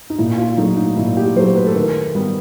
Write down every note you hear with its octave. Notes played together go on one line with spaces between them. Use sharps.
D#4
A#2 E4
F4
F#3 A3 D#4
D#4
A#2 E4
G4
F#3 A3 C5
B4
A4
D#3 A#4
G3 B3